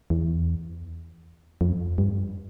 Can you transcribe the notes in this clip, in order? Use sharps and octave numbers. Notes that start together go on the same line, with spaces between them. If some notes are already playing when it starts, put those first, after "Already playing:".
E2
F2
G2